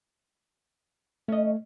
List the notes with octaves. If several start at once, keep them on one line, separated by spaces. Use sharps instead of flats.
A3 C#4 D#5